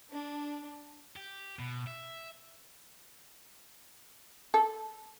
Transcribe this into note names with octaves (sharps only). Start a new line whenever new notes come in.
D4
G4
B2
E5
A4